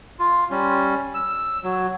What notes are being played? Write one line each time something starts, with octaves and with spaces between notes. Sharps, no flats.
F4
G3 C#4
E6
F#3